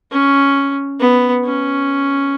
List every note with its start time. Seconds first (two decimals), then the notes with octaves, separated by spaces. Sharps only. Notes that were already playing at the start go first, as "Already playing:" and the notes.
0.11 C#4
1.00 B3
1.45 C#4